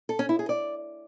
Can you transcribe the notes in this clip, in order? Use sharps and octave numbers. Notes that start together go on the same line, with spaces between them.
A4
C#4
E4
G#4
D5